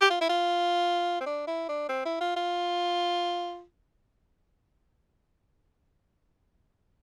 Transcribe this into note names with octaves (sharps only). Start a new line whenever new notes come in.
G4
F4
E4
F4
C4
D4
E4
D4
C4
E4
F4
F4